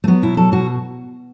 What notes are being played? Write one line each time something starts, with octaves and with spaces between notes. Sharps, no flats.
A3
F#3 B3
B2 E4
F#3 A4
B2 F#4